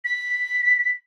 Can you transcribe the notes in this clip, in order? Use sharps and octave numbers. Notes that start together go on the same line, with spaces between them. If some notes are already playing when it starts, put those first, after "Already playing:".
B6